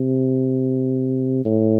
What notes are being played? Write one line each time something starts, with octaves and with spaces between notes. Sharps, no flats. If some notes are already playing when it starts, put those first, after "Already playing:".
Already playing: C3
A2